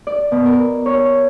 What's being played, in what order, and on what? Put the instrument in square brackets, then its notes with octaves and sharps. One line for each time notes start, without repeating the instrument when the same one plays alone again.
[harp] D5
B2
A#4
C#5